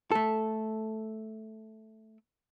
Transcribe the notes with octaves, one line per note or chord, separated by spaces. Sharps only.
A3 A4